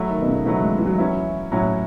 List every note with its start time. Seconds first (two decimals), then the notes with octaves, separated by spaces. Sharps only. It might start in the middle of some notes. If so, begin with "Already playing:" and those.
Already playing: F#3 A3 E4
0.10 D#3
0.22 B2
0.28 C#3
0.46 E3 F#3 A3 E4
0.59 G#3
0.78 E3
0.86 F#3
0.98 E3 F#3 C#4 E4
1.52 A2 F#3 C#4 E4